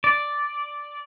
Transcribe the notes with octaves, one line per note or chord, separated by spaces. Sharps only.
D5